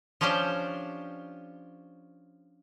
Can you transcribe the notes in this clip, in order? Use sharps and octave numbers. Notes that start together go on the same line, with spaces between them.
F3 C#4 D4 G4 C5